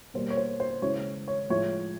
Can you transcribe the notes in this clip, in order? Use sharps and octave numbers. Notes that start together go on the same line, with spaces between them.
B2 G3 A#3 C5
C#5
C5
C5
C#3 E3 G#3 C#5
C#5
A2 F3 G#3 C#5